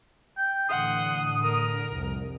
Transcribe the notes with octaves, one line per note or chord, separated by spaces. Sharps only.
G5
A2 D3 E3 F#5 C6 D#6
A#4
C2 F2